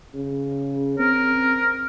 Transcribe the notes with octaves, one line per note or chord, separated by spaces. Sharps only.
C#3
C4 A#4